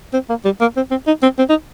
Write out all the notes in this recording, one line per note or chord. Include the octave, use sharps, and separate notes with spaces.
C4
A#3
G3
A#3
C4
C4
D#4
C4
C4
D#4